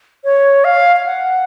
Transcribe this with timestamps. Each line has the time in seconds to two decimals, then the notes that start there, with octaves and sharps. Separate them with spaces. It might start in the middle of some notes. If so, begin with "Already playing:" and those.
0.24 C#5
0.64 F5
0.96 F5
1.06 F#5